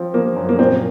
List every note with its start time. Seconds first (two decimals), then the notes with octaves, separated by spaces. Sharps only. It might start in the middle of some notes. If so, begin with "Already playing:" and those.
Already playing: F3 C4
0.14 F3 A#3
0.36 F#2
0.49 A#3
0.59 A#2 C4